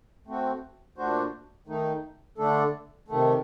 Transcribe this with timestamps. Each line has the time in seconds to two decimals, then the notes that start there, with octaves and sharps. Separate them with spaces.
0.27 A3 C4 F#4
0.97 A#2 A3 D4 F#4 C5
1.67 D#3 A3 D#4
2.38 D3 A3 D4 A4
3.08 C3 D#3 A3